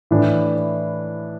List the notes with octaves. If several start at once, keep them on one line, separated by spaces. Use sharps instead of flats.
A2 E3 D4